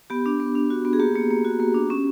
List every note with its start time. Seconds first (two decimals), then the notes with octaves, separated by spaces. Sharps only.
0.10 B3 G4
0.26 D4
0.40 B3
0.55 D4
0.70 F#4
0.85 B3
0.93 G#4
1.00 A#3 G4
1.15 A#3
1.31 A#3
1.45 F#4
1.60 A#3
1.74 D4
1.90 C#4